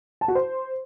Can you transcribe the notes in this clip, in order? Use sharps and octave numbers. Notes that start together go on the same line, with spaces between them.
A5
F#4
C5